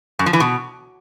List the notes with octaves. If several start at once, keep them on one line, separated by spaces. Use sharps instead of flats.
F#2
F3
E3
B2